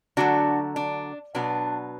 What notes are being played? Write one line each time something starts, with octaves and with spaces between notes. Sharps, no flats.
D3 F#3 A3 D4 F#4
D4
B2 F#3 B3 D4